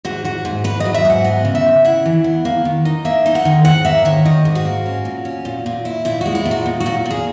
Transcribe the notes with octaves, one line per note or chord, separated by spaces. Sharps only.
G#2 F#4
G#2 F#4
G#2
G#2 B4
D#5
F#3
E5
G#2 F#5
B3 D#5
C#3
E5
C#3
E4 F#5
E3
B3
A#3
D#3
D#4
A#3 E5
D#4
F#5
D#3
G#2 F#5
A#3 E5
D#3 C#5
D#3 D#5
G#2
F#4
A#3
C#4
A#2
C#4
A#2
A#2
E4
A#2 E4
G#3 F#4
E4
A#2
F#4
A#2
F#4
A#2
A#2
G#4